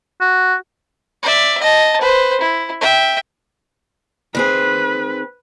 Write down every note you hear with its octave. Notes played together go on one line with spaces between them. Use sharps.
F#4
D5 E5
D#5 A5
B4 C5
E4
E5 G5
D#3 C4 G#4 B4